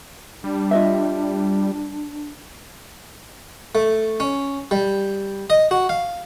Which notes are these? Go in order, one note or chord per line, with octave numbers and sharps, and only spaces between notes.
G3 D4
F4 D#5 E5
A3
C#4
G3
D#5
F#4
F5